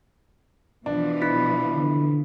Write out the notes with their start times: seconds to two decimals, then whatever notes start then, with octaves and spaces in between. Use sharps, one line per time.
0.86 B2 E3 F3 D4
1.22 E4 B6
1.75 D3